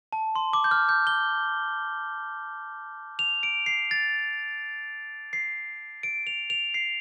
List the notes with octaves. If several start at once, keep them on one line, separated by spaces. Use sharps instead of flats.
A5
C6
D6
G6
F6
G6
G7
F7
D7
C7
A6
C7
D7
F7
F7
C7